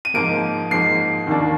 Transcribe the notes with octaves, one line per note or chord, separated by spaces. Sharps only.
D#7
G#2 F3 A#3 D7
G#2 F3 A#3 C7
D#2 D#3 A#3 D4